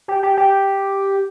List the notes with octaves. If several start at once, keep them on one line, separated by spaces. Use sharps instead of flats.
G4
G4
G4